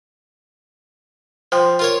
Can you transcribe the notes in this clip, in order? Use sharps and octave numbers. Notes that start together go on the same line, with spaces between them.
F3 C5 G5 C6
F4 A#4 C#5